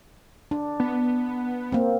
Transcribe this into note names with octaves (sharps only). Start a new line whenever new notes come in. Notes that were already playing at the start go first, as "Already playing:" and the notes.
D4
B3
A#3 C4